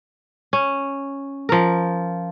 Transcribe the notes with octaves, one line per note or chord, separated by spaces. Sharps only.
C#4
F3 A#4